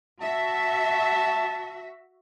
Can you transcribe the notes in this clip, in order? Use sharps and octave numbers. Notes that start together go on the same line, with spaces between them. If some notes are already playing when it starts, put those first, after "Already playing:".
F#4 E5 A5